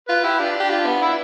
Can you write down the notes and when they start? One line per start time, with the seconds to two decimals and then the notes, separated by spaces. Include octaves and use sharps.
0.08 F4 B4
0.24 E4 G4
0.39 D4 F4
0.60 G4
0.70 F4
0.86 B3
1.02 E4